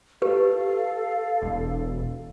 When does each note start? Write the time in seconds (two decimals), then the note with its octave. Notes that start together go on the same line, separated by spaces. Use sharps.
0.22 G4 A4 B4 F5
1.42 E1